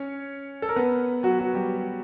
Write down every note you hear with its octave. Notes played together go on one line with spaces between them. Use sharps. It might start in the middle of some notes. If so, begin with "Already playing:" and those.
Already playing: C#4 C#5
A4
A#4
B3 B4
F#3 F#4
F#3 F#4
G3 G4